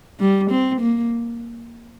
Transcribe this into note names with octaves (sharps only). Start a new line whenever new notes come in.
G3
C4
A#3